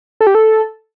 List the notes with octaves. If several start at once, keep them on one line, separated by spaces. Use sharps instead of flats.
A4
G4
A4